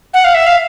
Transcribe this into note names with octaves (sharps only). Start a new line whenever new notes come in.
F#5
F5
E5
F5